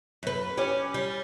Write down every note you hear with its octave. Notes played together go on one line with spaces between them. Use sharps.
F#2 B4
C#4 G4 D5
G3